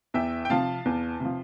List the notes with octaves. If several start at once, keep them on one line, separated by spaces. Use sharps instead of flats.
E2 E5 G5
G5
C3 F3 F5 A5
E2
C3 F3